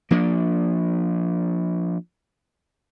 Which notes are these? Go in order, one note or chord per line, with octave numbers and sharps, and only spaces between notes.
F3 A#3 D4